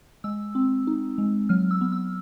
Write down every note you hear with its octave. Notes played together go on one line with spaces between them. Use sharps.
G#3 E6
C4
D#4
G#3
F#3 F6
E6
B3
E6